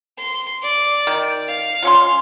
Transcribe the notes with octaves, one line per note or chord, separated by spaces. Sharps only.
C6
D5
D#3
F5
F3 C#4 C6